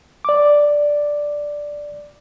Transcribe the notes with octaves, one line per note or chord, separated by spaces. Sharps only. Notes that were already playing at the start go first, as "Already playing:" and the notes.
D5 D6